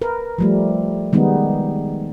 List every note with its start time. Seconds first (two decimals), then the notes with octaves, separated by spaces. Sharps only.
0.02 A#4 B4
0.38 F3 G3 A3
1.13 D#3 G3 G#3 B3 D#4